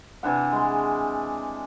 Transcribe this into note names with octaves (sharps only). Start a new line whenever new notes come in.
C3 E3 D4 F#5
G#3 C6